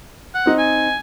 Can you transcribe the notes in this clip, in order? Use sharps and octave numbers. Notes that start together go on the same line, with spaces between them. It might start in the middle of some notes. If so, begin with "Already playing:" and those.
F#5
C4 D#4
G#5